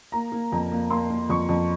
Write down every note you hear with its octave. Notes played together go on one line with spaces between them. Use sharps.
A#3 A#5
A#3
F2 A#5
A#3
A#3 C6
A#3
F2 C#6
F2